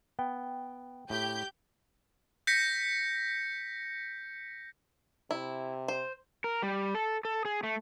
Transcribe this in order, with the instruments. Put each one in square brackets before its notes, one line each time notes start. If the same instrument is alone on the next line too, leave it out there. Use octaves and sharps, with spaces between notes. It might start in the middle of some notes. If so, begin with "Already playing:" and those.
[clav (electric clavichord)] B3 [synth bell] G5
[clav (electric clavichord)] A2 [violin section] G4 G6
[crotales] G6 A#6 B6 C#7
[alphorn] C3 [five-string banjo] E4
[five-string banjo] C5
[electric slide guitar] A#4
G3
A4
A4
G#4
A3